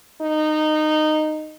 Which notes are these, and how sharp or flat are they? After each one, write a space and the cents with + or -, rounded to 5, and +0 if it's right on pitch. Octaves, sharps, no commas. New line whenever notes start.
D#4 -15